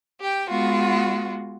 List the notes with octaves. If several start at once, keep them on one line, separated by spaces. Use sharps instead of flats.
G4 G5
G#3 B3 F4 F#4